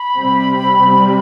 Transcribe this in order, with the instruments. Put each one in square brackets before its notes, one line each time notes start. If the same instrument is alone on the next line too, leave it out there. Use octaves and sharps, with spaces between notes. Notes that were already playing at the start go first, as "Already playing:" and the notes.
Already playing: [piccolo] B5
[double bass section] C3 G3 C4
C3 G3 C4